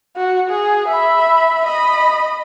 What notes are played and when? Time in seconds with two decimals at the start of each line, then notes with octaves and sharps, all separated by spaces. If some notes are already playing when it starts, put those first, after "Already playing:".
0.16 F#4
0.50 G#4
0.88 E5 B5
1.65 D#5 B5